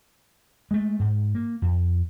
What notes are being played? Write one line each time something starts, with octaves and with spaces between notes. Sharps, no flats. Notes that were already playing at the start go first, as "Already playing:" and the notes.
G#3 A3
G#2
A#3
F2